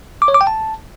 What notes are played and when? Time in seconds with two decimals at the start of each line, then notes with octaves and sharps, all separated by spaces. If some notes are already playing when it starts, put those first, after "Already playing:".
0.22 D6
0.28 C#5
0.34 D6
0.41 G5
0.47 A5